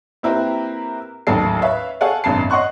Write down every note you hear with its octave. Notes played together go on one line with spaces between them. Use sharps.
A#3 C4 E4 G4 A#4 B4
A1 D#2 F#3 A4 C7
B4 C#5 E5 F5
G#4 A4 C#5 F5 F#5 G#5
G#1 F#2 B2 A5 C7
C#5 D#5 F#5 C6 C#6 F#6